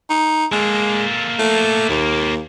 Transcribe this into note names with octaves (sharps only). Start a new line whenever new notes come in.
D#4
G#3 A#3 A4
A3
D#2